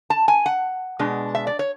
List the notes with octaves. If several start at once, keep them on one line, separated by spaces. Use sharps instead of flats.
A5
G#5
F#5
B2 G#3 D4
E5
D5
C#5